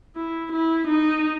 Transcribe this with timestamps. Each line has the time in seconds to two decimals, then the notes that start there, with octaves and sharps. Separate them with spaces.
0.16 E4
0.52 E4
0.88 D#4